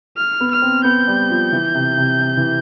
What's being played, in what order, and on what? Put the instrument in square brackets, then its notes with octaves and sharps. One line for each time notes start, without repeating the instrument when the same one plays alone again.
[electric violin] F6
[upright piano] B3
[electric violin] F6
[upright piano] C4
[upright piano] B3 [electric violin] G6
[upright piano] G3
F3
E3
C3
C3
C3
E3